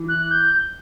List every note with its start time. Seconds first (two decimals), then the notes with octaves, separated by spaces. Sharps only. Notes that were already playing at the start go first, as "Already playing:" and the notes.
Already playing: E3
0.09 F#6
0.31 G6